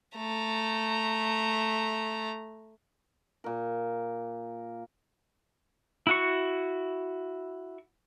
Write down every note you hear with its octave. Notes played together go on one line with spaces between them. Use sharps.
A3 A#5
A#2 A#4
E4 F#4 C#6